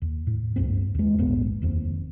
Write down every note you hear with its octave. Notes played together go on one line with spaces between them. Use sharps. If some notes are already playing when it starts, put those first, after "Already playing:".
D#2
A2
C#2 G2 C4
D#2 G#3
D#1 A#1 G#2 B3
F1 D#2 C4